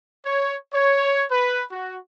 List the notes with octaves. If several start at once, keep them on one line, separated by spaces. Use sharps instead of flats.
C#5
C#5
B4
F#4